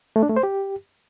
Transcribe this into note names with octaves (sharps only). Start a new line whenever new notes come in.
A3
D4
A3
C5
G4